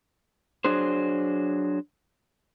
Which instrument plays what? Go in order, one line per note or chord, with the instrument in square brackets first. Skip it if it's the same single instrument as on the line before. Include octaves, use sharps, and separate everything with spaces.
[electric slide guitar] F#3 D4 G#4 C5